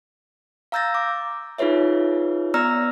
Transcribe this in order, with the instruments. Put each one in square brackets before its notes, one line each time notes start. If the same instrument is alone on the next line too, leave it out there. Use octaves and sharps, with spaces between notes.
[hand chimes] F5 A#5 E6 G6 A6 A#6
D6
D#4 F4 G#4 B4 C#5 E5
B3 D5 A#5 E6 F6 A#6